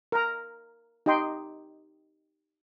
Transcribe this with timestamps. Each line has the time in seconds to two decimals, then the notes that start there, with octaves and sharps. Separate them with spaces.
0.12 A#4 A#5
1.06 D#4 G4 D#5 G5 C6